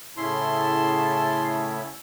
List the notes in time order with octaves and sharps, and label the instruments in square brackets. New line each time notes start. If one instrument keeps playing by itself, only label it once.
[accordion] A2 C#3 E4 [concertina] C#4 C#5 E5 [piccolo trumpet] A5 [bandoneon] C6